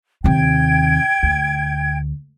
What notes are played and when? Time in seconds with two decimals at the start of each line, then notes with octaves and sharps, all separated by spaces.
0.24 D#2 C3 G5 G#6
1.23 D2